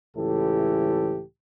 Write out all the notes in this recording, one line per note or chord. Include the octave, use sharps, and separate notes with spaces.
C#2 A2 E3 G4 A4